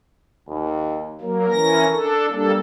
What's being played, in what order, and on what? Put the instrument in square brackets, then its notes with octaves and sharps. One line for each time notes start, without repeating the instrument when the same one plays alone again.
[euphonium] D#2
[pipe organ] F#3 A#3 [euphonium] A#4
[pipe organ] E3 C#4 A#6
D4 A4
[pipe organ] G3 A#3 A4 [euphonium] D4